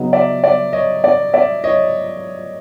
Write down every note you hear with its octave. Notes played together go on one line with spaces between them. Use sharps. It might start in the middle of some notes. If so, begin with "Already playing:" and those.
Already playing: C#3 F#3 B3 D#4
D5 E5
D5 E5
C#5 D#5
D5
D5 E5
C#5 D#5